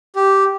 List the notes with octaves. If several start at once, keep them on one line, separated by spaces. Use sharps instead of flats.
G4